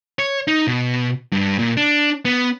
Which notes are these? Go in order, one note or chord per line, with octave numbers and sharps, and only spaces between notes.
C#5
D#4
B2
G2
A#2
D4
B3